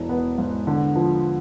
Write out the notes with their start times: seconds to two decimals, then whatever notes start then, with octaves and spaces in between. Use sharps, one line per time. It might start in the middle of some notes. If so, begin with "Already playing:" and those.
Already playing: E1 E3
0.09 B3
0.38 G#2
0.67 D3
0.95 F3